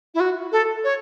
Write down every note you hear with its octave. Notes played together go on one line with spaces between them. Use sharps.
E4
F#4
A4
C#5